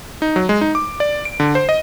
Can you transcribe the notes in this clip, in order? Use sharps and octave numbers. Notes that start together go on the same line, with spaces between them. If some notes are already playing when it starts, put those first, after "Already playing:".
D#4
F#3
G#3
D#4
D6
D5
D7
D3
C5
D#5